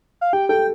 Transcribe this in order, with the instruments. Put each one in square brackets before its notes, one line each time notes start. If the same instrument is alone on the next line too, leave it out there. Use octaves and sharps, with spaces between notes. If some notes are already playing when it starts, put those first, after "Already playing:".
[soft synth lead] F5
[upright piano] G4 [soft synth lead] G5
[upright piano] A4 [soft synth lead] G5